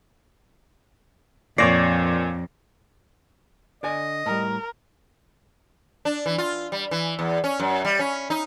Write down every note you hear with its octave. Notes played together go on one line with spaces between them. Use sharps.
F2 A#2 C#5 D5 A#6 C7
D3 D5 D#5 G#5
A2 G3 A#4
D4
E3
F4
G3
E3
E2
C#4
F#2
G3
C#4
D#4